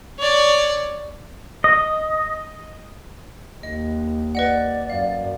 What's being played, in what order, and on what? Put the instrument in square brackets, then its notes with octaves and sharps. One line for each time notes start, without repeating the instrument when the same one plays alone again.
[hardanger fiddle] C#5 D5
[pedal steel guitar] D#5
[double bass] D#2 [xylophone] D#5
[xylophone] B4 D#5 F#5 [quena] D5
[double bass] F#2 [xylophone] F5